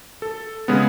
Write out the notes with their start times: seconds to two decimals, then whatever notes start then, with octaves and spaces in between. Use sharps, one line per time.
0.22 A4
0.68 C#3 G#3 B3 G#4